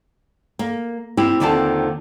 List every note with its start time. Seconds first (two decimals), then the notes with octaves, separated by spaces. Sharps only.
0.59 A#3
1.17 C4 E4 G4
1.40 D#2 D3 D#3 C4 F4 A5